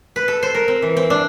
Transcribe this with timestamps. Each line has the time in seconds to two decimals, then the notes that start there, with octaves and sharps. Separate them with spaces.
0.16 B4
0.28 A4
0.43 C5
0.55 A#4
0.68 C4
0.82 E3
0.97 C4
1.10 D4